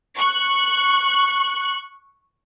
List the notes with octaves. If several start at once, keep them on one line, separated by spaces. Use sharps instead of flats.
C#6 F#6